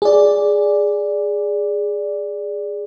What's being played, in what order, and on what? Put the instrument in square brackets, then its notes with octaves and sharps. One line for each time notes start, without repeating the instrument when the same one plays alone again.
[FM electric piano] G#4 D5